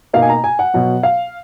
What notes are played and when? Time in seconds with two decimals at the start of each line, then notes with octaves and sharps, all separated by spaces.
0.13 B2 A#3 D#4 F5
0.22 G#5
0.29 A#5
0.44 G#5
0.59 F#5
0.74 B2 F#3 B3
1.03 F5